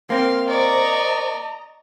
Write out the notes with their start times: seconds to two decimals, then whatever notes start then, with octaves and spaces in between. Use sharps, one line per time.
0.10 A#3 C4 C5 F5 C6
0.48 D5 D#5 A#5 C#6